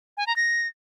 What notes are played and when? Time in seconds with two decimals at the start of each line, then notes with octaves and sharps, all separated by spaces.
0.17 G#5
0.27 A#5
0.36 A#6